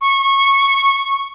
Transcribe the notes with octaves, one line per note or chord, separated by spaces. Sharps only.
C#6